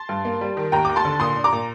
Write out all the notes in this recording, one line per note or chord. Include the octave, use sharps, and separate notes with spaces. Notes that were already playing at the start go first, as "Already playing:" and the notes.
Already playing: A5 C6
G2
A#3
G3
D#3
D#2 G5 A#5
D#2 D6
A5 C6
D3
A#2 C6 D#6
D4
A#5 D6
A#2